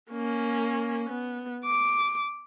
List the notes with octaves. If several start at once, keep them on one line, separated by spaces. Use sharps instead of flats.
A#3 C#4
B3
D6